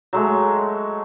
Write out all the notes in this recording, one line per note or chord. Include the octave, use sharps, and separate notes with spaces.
F#3 G#3 A3